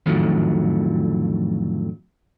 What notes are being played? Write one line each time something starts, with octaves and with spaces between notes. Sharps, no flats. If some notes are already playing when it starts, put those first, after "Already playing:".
F2 A2 D3 D#3 F3 F#3